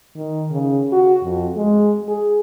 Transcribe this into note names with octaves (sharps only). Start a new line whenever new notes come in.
D#3
C#3
F#4
F2
G#3
G#4